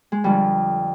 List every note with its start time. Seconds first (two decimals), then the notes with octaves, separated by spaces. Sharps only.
0.12 G#3
0.24 F2 D3 F3 G3